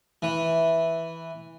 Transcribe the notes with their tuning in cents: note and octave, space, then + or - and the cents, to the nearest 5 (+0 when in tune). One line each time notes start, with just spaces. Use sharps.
E3 -5